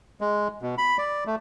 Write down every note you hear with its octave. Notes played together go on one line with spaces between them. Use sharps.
G#3
B2
B5
D5
A3